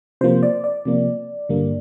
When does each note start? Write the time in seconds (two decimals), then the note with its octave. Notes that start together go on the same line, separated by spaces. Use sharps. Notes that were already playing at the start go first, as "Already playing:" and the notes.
0.21 C3 F3 A#3 C5
0.43 D5
0.64 D5
0.85 C3 F3 A#3
1.49 G2 D3 G3 A#3